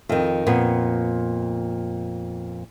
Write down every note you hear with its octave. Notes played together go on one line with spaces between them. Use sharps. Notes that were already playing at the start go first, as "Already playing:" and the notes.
F2 D#3
F2 A#2 B3